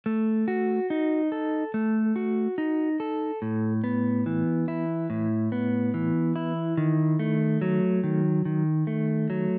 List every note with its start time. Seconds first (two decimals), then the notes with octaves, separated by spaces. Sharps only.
0.06 A3
0.48 F#4
0.90 D#4
1.32 A4
1.74 A3
2.16 F#4
2.58 D#4
3.00 A4
3.42 A2
3.84 B3
4.26 E3
4.68 E4
5.10 A2
5.52 B3
5.94 E3
6.36 E4
6.77 D#3
7.19 A3
7.61 F#3
8.03 D#3
8.45 D#3
8.87 A3
9.30 F#3